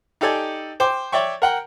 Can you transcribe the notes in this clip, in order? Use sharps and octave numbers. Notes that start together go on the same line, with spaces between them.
D#4 G4 A4 D5 G#5
C5 G5 D6
C#5 D5 E5 G5 C#6
A#4 F#5 G5